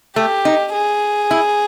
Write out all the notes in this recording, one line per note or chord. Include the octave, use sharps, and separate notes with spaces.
A3 G4
D#4
G#4
E4